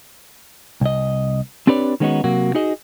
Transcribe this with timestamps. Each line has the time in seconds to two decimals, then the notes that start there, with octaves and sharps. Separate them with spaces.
0.81 C2 D#5
1.67 C4 D4 G4 B4 C#5 D5
2.00 D#3 G#3 B3 C#4 D#4 F#4
2.24 C3 F#3 A#3 F#4
2.55 D#4 F#4 G#4 D#5